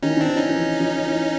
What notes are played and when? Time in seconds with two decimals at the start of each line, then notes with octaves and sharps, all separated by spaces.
0.02 D#3 C#4 D#4
0.10 E3
0.17 D#3 C4 D4
0.29 E3
0.37 C#4 D#4
0.49 E3
0.55 F3
0.80 F3
1.06 E3